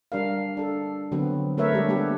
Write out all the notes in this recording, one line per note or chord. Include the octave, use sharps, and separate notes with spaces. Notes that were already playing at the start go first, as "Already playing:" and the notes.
G3 D4 A#4 F5
D4 A4
D3 F#3 B3 C4
A3 A#4 B4 C#5 E5
G3 G#3 D4 G4
A#3 B3 D4 G4 A4 B4